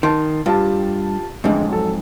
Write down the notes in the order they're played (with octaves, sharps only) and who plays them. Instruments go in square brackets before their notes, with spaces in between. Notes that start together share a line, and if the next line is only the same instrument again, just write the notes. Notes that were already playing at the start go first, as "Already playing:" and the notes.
[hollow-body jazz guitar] D#3 [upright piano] A5 C6
[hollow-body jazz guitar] G2 [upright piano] F4 G4 A5
[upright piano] A1 D3 G#3 [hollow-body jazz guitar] F2 G#2
[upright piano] F#3 A4